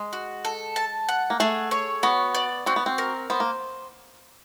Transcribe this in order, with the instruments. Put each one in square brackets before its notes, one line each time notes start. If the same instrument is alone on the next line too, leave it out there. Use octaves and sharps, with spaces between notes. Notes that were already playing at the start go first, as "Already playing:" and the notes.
Already playing: [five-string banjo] G#3
[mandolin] F#4
A4
A5
F#5
[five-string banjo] A#3
[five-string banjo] A3 [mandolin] G#4
[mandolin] C#5
[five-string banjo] B3 [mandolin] F#4
[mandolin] D5
[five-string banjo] C4 [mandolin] F#4
[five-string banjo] B3
C4
[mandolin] A#4
[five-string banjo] B3 [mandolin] C5
[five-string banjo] A#3